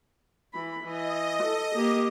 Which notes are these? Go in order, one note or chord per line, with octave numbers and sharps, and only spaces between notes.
E3 B5
E3 D#5
A4
A#3 G4